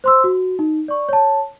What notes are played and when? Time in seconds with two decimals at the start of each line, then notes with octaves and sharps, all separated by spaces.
0.04 C5 C6 E6
0.24 F#4
0.59 D#4
0.88 D5 C#6
1.09 C#5 A5